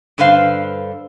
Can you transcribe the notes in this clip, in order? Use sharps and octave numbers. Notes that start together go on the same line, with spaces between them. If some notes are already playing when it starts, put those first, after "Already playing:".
G2 D3 B4 C5 F5